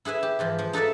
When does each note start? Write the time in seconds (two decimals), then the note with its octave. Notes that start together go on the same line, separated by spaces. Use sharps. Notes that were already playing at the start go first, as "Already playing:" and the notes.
0.05 E4 G#4 B4 E5
0.23 G4
0.39 G#2 E3 F3
0.59 F3
0.73 D#4 A4 B4 D5 E5